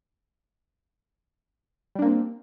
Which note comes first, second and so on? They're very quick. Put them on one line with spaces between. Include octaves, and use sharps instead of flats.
G3 D4 A#3 C4